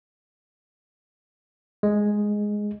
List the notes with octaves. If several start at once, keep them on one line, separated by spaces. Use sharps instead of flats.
G#3